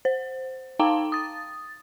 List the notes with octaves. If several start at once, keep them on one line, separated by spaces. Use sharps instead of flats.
C5
D#4 F5 G5 A5 A#5 D6
D#6 A6